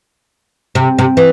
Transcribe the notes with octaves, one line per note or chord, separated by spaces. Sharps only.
C3
C3
E3